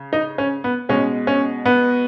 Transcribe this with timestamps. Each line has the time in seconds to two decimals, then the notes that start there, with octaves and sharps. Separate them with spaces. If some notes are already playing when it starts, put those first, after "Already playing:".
Already playing: C#3
0.13 D#4
0.38 C#4
0.64 B3
0.89 B2 G#3 C#4
1.27 C#4
1.66 B3